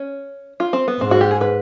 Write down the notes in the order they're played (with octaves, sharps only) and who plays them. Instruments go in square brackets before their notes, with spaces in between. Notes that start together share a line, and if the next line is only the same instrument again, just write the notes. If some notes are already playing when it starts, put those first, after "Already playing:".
Already playing: [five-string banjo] C#4
F4
C4
B3
[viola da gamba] G#2 [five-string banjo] C4
[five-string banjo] F#4
G4
G#4
B4